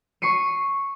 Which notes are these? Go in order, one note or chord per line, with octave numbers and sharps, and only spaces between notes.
C#6 C7 C#7 D#7